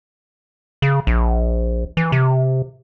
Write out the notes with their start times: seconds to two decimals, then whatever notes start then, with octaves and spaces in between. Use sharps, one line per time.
0.82 C#3
1.07 A#1
1.97 E3
2.12 C3